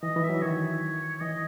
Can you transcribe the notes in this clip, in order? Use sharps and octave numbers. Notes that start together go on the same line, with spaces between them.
E3 D#5
E3
E5
F#3
D#3 C#5
E3 D#5